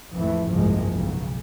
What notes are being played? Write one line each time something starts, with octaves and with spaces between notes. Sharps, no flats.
A1 F2 E3 A3
F#1 C2 G#2 F3 G#3
B1 C#3